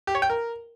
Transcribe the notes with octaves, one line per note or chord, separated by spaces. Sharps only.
G4
C#5
G5
A#4